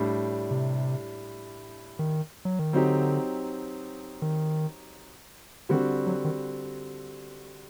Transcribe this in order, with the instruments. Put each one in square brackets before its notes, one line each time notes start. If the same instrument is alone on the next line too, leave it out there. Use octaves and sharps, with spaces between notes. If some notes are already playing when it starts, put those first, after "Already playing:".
Already playing: [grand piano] A2 G3 D4
[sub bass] C3
D#3
F#3
D#3
[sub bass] D3 [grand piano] F#3 C4 D#4 G4
[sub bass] D#3
[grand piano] D3 G3 C4 F#4 [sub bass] D#3
[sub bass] F#3
D#3